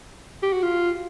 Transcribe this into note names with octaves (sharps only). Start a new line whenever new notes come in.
G4
F#4
F4